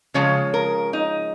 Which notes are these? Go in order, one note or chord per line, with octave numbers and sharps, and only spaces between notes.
C#3 F3 G#3 C#5
A#4
D#4